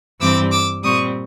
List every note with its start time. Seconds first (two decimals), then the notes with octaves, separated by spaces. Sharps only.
0.20 G2 E3 G3 C4 D6 E6
0.51 D6 E6
0.83 A#2 G3 C4 C#6 D#6